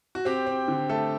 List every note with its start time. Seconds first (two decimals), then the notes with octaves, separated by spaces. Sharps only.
0.15 F#4
0.25 C4 G4
0.46 C4
0.68 D3
0.89 A3 A4